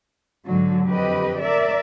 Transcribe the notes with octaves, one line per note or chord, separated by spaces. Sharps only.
G#2 D3 F#3
F2 D3 G4 B4 D#5
A#4 D5 E5